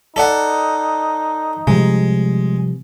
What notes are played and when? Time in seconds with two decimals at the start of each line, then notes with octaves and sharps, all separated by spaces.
0.16 D#4 A4 D5 F#5
1.67 C3 F3 G3 G#3